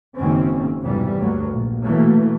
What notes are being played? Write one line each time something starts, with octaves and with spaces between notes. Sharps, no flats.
F#1 G#2 D#3 C4 C#4
B1 F2 G#2 C3 E3 G3
D2 G2 D3 F#3 A#3
A#1
B2 E3 F#3 A3 A#3